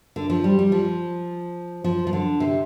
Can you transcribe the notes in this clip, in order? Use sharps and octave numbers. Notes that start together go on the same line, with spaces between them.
D3
F3
G3
G3
F3
F3
F3
D3
C3